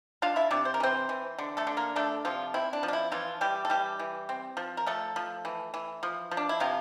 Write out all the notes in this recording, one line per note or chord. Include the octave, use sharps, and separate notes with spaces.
D4 F4 F5
E4 E5
C3 D4 D5
C5
A#4
E3 C4 C5
E3
D3
A3 A4
D3
A#3 A#4
A3 D4 A4
C3 F3 F4
C4 E4
D4
F3
D4
E4
E3 F3 F4
E3 G3 G4
A4
E3 G3 G4
E3
C4
F3
A#4
F3 A3 A4
F3
E3
E3
F3
F3
D4
E4
C3 F3 F4